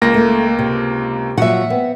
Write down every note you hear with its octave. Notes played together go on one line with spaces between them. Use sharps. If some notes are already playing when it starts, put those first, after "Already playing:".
C#2 A#3 A#6
A3 A#4
C3
A#2 F3 F#3 E5 F#5
B3 C4